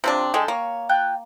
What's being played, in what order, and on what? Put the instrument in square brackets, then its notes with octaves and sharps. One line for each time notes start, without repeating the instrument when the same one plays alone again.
[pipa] C3 C4 D4 [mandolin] F4
[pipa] D3 G#3 [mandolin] A4 G5 A5
[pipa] A#3 [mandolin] C#5
[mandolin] F4 G5 F#6